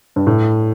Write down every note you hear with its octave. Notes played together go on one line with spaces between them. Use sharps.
G2
A2